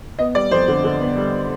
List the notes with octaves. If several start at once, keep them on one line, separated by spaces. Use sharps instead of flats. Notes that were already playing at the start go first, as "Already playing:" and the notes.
B3 D#5
G3 D5
F2 C5
D3
D3
B3
G3